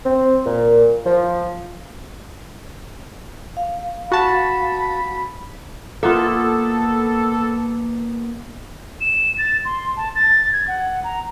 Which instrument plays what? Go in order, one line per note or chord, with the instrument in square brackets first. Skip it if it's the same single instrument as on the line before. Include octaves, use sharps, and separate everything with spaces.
[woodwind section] C4
A#2
F3
[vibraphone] F5
[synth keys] F#4 A5 [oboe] B5
[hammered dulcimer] A#3 B3 [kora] F4 E5 [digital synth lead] A4
[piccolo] E7
A6
C6
A5
A6
G#6
F#5
A#5